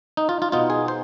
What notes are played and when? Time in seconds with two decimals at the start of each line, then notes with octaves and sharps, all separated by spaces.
0.17 D#4
0.29 F4
0.42 F4
0.52 B2 B3 D#4 F4
0.70 G#4
0.88 C5